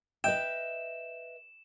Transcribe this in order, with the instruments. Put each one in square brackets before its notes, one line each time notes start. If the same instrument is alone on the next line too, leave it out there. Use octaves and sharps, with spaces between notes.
[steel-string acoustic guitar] B4 D#5 E5 [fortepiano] G5 [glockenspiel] E7